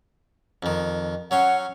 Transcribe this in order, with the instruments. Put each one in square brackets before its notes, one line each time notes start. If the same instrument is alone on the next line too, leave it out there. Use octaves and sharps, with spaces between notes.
[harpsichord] F2 D#3
[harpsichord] F#3 C#4 C6 [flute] F#5